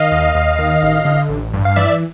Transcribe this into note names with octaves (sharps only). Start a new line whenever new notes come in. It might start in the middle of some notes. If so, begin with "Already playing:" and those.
Already playing: D#3 D#5 F5
D#2
D#2
D#3
A1
D3
A1
G2
F5
E3 D5 E5